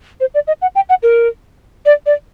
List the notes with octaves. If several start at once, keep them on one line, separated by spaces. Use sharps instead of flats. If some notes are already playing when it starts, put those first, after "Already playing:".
C5
D5
D#5
F#5
G5
F#5
A#4
D5
D5